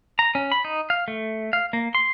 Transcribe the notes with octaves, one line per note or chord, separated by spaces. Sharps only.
A#5
C#4
B5
D#4
F5
A3
F5
A#3
C6